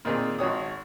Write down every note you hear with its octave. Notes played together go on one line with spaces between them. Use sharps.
A#2 D#3 C4 G#4
G#1 F#4 C#5 D#6